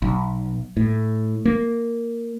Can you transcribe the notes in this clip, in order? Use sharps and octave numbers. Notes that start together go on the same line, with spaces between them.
B1
A2
A#3